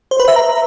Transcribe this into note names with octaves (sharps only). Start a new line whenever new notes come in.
C5
B4
E5
A#5